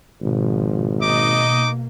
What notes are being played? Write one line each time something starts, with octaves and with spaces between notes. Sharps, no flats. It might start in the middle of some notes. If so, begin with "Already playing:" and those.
G#1 B2 F3
B2 A#3 D#4 D#5 D6